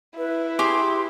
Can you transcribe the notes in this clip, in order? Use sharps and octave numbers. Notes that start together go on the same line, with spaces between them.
E4 B4
G4 G#4 C6